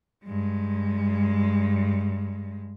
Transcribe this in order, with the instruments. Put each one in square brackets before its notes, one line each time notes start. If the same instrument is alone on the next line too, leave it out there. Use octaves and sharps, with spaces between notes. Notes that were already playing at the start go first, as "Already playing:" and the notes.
[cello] G2 G#3